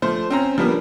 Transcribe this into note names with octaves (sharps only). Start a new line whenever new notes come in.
F3 A3 C5
C4 C#4 A#5
F3 G3 A#3 B3 D4